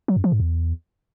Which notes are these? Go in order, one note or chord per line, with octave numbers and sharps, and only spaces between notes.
F#3
F#2
F3
G#2
E2